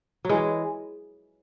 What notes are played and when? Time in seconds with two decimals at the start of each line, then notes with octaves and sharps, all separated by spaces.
0.25 E3 F#3 G#3